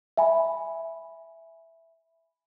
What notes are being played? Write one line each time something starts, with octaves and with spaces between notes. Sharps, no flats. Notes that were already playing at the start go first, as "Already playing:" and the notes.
E5 G#5 B5